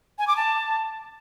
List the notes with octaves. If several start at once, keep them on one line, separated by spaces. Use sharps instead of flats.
G#5
D6
A5